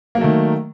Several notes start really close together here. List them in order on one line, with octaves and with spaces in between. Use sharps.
A#3 F#3 A3 D#3